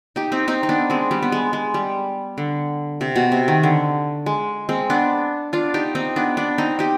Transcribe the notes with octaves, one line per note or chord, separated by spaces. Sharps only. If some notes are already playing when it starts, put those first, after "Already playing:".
D#4 G4
C4 D#4
C4 D#4
D#4
B3 D4
G#3 C4
G3 B3
B3
G#3
G#3
G3
D3
C3
B2
C3
D#3
D3
G#3
G#3 C4
B3 D4
D4 F4
D#4 G4
C4 D#4
B3 D4
B3 D4
C4 D#4
D#4 G4